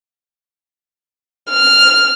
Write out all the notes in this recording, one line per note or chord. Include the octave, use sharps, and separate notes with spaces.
F6